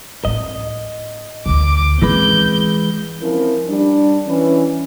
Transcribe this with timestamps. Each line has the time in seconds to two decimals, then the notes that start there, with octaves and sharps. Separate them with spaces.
0.25 A2 C4 D#5
1.46 D2 D3 D6
2.02 E3 G#3 C4 C#4 B4 G6
3.21 F3 C4 C#4 E4 A#4
3.68 G3 D4
4.27 E3 C#4